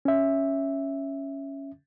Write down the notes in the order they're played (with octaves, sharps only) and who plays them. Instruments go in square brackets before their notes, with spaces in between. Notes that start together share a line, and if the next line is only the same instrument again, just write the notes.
[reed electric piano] C#4 E5